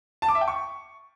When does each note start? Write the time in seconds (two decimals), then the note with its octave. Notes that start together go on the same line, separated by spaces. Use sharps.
0.22 A5
0.29 D6
0.35 E5
0.41 G5
0.48 C#6